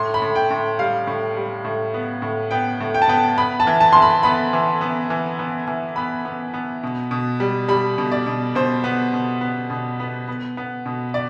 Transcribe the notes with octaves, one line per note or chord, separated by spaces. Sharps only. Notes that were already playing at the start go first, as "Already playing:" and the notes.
Already playing: A2 C6
B5
A2
G5
A2
G3 F5
A2
G3
A2
B3
A2
B3 G5
A2
G5
A5
B3 G5
B3 B5
A5
E3
A5
E3 C6
B5
B3 B5
E3
B3
E3
B3
E3
B3 B5
B3
B3
B2
B2
G3
G3 B5
B2
D5
B2
B2 C5
B3
B2
B3
B2
B3
B3
B3
B2
D5